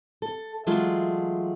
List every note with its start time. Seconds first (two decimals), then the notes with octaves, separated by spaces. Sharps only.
0.22 A4
0.67 E3 F#3 G#3 A3 F4